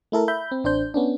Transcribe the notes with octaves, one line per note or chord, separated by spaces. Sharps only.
A3 E4 A4 A#4
E5 B5 G6
C4
A1 D4 C5 G6
B3 C#4 D4